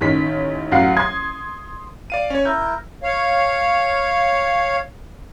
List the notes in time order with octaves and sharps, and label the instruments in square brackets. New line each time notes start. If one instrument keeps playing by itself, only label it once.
[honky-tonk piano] A1 D#3 C#4 B6
A1 F#3 F5 F#5 C7
C6 D#6 G#6
[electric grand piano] D5 F5 D#7
C#4 C#5
[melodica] E4 A#4 [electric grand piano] G6
[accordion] C#5 F5